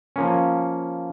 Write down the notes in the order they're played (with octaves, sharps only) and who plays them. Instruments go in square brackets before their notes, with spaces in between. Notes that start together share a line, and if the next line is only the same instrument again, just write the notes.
[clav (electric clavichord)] F3 A#3 C#4